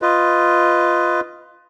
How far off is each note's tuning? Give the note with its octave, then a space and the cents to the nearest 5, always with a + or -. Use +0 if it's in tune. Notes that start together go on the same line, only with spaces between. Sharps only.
F4 +0 B4 +20 D#5 +0